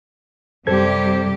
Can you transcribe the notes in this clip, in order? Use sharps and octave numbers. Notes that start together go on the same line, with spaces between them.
F#2 C3 G3 G4 A4 C5 G#6